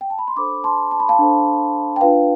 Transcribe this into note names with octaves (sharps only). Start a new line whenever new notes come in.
G5
A5
B5
C6
D4 A4 C5 B5 D6
A5 C6
A5
B5
F5 A5
D4 A4 C5
G5
D4 F4 B4 F5